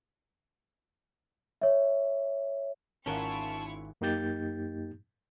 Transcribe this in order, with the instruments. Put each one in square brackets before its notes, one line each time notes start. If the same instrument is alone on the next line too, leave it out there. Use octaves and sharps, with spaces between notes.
[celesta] C#5 E5
[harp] G#1 F#5 [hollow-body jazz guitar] C#4 A#4 [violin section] E4 F4 C#6 [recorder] A5
[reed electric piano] F#2 A#3 D#4 G4 G6 A6